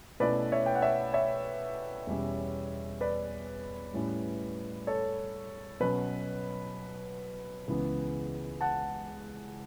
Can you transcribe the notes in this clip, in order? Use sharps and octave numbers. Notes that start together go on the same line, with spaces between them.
B2 A3 C#4 E4 B4 D5
C#5 E5
G5
F#5
C#5 E5
C#5 E5
E2 B2 G3 C#4
B4 D5
A2 G3 C#4 E4
A4 C#5
B2 F#3 C#4 B4
C#2 C#3 E3 B3
F#5 A5